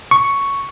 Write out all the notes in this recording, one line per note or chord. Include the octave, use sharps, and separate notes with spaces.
C#6